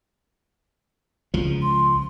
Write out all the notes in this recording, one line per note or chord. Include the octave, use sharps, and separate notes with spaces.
C#2 F3
C6